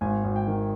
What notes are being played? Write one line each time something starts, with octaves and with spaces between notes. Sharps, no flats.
G#1 G#5
G#1
G5
D#3